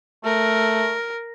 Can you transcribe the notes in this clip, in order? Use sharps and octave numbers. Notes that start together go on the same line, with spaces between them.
A3 A#4